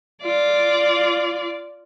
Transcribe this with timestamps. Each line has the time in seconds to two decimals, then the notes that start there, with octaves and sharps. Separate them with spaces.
0.22 F4 D5